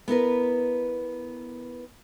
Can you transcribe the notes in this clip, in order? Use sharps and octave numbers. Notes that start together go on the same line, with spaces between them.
B3 E4 A#4 B4